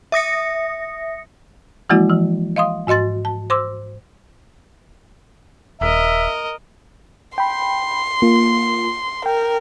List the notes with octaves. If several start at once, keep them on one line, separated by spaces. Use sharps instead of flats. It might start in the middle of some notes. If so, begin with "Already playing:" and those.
E5 D#6 A#6 C#7
E3 F3 G#3 A#3 E4 F#4
E3 F3
D#5 F5 C6 D#6
G#2 F#4 D#5 C6 A6
A5
C5 C6 D6 E6
D#1 A#4 D#5 E5
G5 B5 C6
A#3 F4
A#4 G5